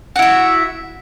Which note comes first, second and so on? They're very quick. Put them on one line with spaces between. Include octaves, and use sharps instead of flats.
F#4 E4 E5